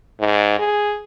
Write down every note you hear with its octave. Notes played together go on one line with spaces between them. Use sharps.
G#2
G#4